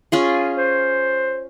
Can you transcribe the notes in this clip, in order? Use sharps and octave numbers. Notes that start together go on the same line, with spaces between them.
C#4 F4 G#4
C5